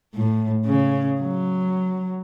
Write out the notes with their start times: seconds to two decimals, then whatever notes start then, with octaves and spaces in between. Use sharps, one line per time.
0.15 A2
0.65 C#3
1.21 F#3